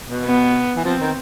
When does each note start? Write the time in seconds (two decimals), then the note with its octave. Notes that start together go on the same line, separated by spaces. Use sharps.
0.09 B2
0.25 B3
0.77 E3
0.85 F3 C4
1.01 D#3